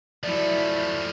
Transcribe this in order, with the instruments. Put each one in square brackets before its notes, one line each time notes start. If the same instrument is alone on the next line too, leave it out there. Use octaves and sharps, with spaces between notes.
[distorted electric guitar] F3 A3 [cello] F#3 E4 [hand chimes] D5